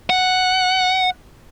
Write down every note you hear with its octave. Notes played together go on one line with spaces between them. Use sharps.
F#5